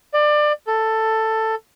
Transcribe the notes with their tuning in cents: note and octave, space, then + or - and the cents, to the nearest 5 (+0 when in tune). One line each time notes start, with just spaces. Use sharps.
D5 +25
A4 +10